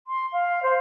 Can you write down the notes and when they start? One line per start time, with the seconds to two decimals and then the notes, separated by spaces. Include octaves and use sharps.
0.07 C6
0.33 F5
0.63 C5